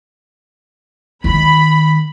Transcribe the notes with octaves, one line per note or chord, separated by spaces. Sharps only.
D#3 G#3 B5